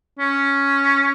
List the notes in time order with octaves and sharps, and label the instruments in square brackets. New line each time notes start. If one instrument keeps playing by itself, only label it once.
[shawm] C#4